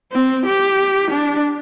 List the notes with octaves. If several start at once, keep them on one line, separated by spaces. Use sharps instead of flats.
C4
G4
D4